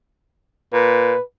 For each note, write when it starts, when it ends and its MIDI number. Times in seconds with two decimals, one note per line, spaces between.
0.73 1.14 46
0.73 1.22 71